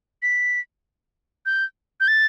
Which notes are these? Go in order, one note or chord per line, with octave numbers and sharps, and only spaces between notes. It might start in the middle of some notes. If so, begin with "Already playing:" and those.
B6
G6
G6
A6